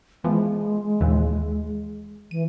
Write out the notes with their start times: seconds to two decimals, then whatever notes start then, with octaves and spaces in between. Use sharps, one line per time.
0.24 E3 F3 G#3 B3
1.00 D#2 A#2 E3
2.31 E3 D#7